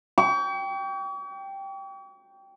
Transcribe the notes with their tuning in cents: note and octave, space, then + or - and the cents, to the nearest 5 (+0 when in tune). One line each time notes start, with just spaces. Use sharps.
G5 +0 C#6 +45